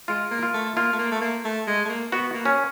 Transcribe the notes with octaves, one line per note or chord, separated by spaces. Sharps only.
G#3 F4
A#3
F4
A3
A#3 F4
A3
A#3
A3
A#3
A3
G#3
A3
A#3
B3 F#4
A#3
C#4